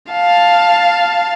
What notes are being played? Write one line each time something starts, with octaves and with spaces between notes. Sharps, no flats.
F5 A5